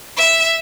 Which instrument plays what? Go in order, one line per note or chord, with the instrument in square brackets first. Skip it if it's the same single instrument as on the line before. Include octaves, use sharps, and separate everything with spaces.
[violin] E5